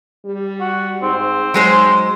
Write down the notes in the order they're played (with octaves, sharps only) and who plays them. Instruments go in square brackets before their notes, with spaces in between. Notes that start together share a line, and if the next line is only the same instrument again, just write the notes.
[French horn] G3
[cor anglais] F#4
[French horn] G#2 [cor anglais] C4
[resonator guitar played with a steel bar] F#3 G#3 C5 [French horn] D#4